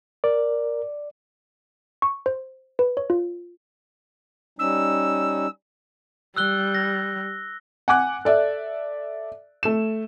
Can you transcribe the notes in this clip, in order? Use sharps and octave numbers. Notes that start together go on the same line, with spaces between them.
A#4 D5
C#6
C5
B4
C#5
F4
G3 C#4 D#4 E6
G3 E6 F#6 G7
A#6
F#5 G#5 D6 F#6
A4 D5 E5
A3 E7